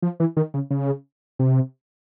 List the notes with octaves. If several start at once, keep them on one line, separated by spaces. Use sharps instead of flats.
F3
E3
D#3
C#3
C#3
C3